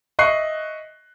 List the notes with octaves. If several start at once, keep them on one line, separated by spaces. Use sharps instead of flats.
D#5 E5 C#6 F#6 C7